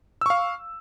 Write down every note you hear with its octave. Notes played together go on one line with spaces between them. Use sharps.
F5 C#6 E6